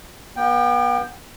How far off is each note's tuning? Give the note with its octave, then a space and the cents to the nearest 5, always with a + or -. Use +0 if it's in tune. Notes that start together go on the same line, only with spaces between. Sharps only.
B3 -40 G5 +0